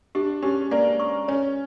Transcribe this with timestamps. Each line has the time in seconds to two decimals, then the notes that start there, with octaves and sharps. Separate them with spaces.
0.15 D4 G4
0.43 C#4 G4
0.71 A#3 D5
1.00 C#6
1.28 C#4 C#5